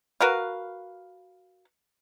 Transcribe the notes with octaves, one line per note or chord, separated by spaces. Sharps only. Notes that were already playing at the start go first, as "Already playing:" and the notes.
F#4 A#4 B4 F5